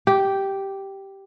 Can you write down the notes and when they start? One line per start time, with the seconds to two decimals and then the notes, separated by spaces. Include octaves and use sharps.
0.07 G4